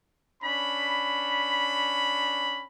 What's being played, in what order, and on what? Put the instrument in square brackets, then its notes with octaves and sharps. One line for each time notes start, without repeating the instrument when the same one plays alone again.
[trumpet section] C#4 D4 B5